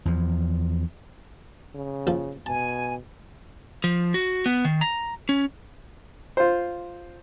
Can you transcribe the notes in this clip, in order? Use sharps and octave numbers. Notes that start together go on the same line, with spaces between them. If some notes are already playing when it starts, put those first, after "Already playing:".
E2 F3
C#3
A#1 F3
B2 G#5 A5
F3
F#4
B3
D#3
A#5
C#4
F4 C5